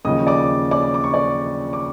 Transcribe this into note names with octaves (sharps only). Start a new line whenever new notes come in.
D#2 C#3 F3 D#5 D#6
D5 D6
D5 D6
D6
C#6
D5 D6
D6